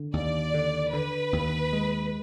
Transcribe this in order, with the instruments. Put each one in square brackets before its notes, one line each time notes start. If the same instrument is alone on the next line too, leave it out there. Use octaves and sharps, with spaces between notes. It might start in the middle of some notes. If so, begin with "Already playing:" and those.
Already playing: [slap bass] D3
[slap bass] D#2 [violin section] D5
[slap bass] D3
[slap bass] D3 [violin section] B4
[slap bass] D#2
G#3